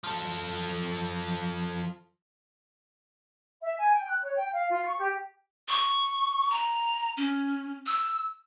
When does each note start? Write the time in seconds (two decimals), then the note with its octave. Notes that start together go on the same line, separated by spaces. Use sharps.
0.04 F3 A4
3.62 E5
3.78 G#5
3.94 G5
4.08 F#6
4.23 C#5
4.36 G5
4.53 F5
4.70 F4
4.86 C#6
4.98 G4
5.68 C#6
6.50 A#5
7.17 C#4
7.87 E6